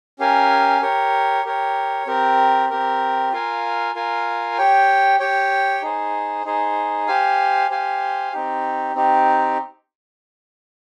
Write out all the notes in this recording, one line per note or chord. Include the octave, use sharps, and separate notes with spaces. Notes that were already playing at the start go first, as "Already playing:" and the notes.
C#4 G4 A#4 F5 G#5
G4 A#4 C#5
G4 A#4 C#5
C4 G4 A#4
C4 G4 A#4
F4 A#4 F5 G#5
F4 A#4 F5 G#5
G4 C#5 G5
G4 C#5 G5
D#4 G#4 C5
D#4 G#4 C5
G4 C5 F5 G#5
G4 C5 F5 G#5
C4 D#4 G4
C4 D#4 G4